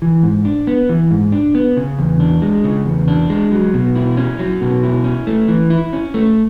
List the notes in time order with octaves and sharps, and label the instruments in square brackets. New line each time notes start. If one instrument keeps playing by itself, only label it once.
[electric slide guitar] E3
G#2
D4
B3
E3
G#2
D4
B3
C#3
E2
D4
G#3
C#3
E2
D4
G#3
F#3
B2
E4
C#4
F#3
B2
E4
C#4
A3
E3
E4
C#4
A3